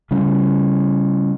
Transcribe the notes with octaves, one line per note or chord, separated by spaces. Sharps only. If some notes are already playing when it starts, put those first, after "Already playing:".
C#3 G3 C#4